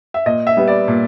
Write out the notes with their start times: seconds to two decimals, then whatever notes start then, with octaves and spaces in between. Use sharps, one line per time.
0.14 E5
0.26 A#2 D#5
0.47 E5
0.57 G3 B3
0.68 D5
0.88 A#2